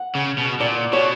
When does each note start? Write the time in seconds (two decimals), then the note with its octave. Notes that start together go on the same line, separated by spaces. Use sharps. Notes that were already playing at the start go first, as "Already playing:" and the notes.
Already playing: F#5
0.15 C#3
0.38 B2
0.60 A#2 D5
0.93 B2 C#5